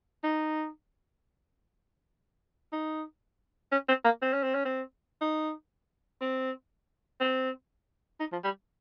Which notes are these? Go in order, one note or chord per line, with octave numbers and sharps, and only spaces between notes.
D#4
D#4
C#4
C4
A#3
C4
C#4
C4
C#4
C4
D#4
C4
C4
D#4
F3
G3